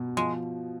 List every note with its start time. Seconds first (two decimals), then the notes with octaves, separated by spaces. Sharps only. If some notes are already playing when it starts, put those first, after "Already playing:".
Already playing: B2
0.17 F3 G#3